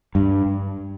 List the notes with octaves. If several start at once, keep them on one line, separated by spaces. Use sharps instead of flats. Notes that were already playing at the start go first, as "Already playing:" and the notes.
G2